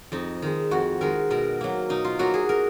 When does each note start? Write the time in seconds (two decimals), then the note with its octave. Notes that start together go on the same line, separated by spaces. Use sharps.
0.12 F2 D#4
0.42 D#3 G#3
0.71 F2 F#4
1.01 D#3 G#3 A#4
1.31 B2 A#4
1.61 F#3 A#3
1.89 B2 D#4
2.04 F4
2.19 F#3 A#3 F#4
2.34 G#4
2.49 A#4